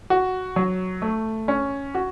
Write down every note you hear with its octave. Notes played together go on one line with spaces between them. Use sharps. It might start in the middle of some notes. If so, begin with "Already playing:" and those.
F#4
F#3
A3
C#4
F#4